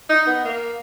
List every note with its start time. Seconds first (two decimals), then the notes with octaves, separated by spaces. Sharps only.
0.09 D#4
0.26 B3
0.44 A#3